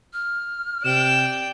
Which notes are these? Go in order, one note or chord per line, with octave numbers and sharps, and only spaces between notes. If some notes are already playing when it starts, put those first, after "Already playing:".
F6
C3 D5 G5 E7